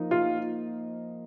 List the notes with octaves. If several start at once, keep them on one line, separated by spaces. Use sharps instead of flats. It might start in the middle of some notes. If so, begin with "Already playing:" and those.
Already playing: F3 A#3 D#4
F4